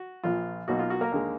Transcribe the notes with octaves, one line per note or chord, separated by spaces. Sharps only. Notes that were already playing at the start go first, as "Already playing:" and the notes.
Already playing: F#4
A#1 A#2 F3 F4
B1 B2 A#3 D#4 F#4
F4
F#4
A#3 A#4
D#2 D3 G#3